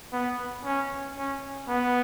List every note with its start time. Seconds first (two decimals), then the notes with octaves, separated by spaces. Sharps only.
0.13 B3
0.65 C#4
1.18 C#4
1.69 B3